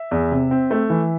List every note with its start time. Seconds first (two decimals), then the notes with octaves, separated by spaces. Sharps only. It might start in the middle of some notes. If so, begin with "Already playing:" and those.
Already playing: E5
0.11 E2
0.32 C3
0.51 C4
0.71 A3
0.90 E3